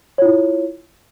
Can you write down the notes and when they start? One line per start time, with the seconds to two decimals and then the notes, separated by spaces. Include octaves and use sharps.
0.18 C#5
0.22 F4
0.25 E4